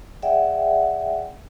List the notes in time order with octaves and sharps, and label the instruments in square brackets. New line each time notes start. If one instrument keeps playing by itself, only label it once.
[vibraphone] G#4 D5 E5 F#5 G5